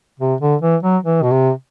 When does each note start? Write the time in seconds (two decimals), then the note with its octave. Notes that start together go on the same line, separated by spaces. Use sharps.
0.20 C3
0.41 D3
0.62 E3
0.83 F#3
1.03 E3
1.22 B2
1.31 C3